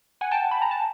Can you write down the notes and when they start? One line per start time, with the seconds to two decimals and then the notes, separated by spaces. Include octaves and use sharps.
0.21 F#5 G#5
0.31 G5 A5
0.51 B5
0.62 A#5
0.71 A5